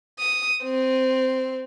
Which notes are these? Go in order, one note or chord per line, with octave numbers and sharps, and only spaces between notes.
D#6
C4